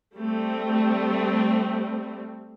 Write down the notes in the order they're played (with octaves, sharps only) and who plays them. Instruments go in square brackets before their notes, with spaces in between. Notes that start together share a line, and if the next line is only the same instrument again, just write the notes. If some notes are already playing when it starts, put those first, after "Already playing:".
[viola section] G3 A3 C4